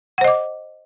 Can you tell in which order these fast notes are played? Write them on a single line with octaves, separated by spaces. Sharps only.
F#5 C5 D#5 D6